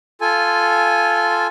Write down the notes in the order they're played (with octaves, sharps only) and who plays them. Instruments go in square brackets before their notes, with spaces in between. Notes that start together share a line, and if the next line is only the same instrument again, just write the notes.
[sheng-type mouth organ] F4 A4 G#5